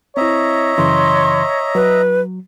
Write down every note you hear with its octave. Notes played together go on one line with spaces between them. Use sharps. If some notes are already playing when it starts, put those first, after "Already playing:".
C4 E4 C#5 D#5 E5 A#5
F#2 C#3 E3 C6
F#3 B4